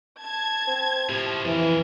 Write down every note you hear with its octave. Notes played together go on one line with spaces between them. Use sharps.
A5 G#6
C4
A2 C3 F3
F2 E3 A#4